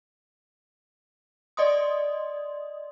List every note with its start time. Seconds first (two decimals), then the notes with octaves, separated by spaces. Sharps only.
1.57 D5 D#5 C6 D#6